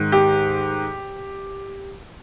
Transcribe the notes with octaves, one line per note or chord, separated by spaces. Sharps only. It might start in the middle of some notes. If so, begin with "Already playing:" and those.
Already playing: G#2 D#3
G4